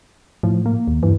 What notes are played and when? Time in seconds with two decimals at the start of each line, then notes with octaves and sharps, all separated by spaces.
0.43 A2 F3
0.65 A#3
0.88 D#2
1.03 G2 E3